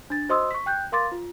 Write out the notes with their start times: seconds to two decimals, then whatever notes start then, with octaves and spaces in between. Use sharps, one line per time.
0.10 D4 A6
0.29 F#4 C5 D#5 C6 D#6 E6
0.51 C#6 B6
0.66 G5 F#6 G6
0.92 A#4 F5 C6 D6 A6
1.12 F4